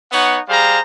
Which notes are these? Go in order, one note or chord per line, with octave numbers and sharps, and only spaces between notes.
B3 D#4 C#5 F#5
G3 G#4 C5 F5 A#5